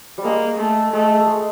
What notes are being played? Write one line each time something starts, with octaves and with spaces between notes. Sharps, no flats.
G3
G#3 A#3
A3
G#3 A3
A3
G#3